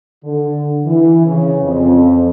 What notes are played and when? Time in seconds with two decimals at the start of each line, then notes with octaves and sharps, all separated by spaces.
0.24 D3
0.86 E3
1.26 C#3
1.64 F2